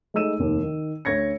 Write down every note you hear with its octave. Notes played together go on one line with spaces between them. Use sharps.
G#3 A3 D#4 E6 D#7 E7
F1 D#2
D#3
D2 C#5 G#6 A#6 C#7